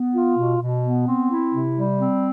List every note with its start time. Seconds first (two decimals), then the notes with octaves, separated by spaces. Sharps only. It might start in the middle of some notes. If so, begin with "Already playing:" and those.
Already playing: B3
0.15 F4
0.38 B2
0.61 B2
0.84 B3
1.07 C4
1.31 E4
1.54 C3
1.78 G3
2.00 C4